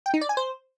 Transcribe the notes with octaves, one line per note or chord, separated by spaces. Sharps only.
G5
D#4
D5
G#5
C5